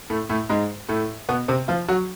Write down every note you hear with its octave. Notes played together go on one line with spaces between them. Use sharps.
A2 A3
A2 A3
G#2 G#3
A2 A3
B2 B3
C3 C4
F3 F4
F#3 F#4